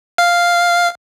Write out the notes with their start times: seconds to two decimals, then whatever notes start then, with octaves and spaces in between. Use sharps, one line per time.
0.18 F5